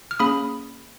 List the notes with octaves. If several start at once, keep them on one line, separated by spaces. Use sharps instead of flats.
F6
A#3 C#4 G#4 B5 D#6